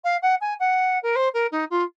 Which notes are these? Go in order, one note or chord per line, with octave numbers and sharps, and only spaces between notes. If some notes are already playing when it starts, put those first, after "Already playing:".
F5
F#5
G#5
F#5
A#4
C5
A#4
D#4
F4